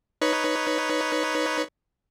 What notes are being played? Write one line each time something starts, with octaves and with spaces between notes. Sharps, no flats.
D#4 B4 C#5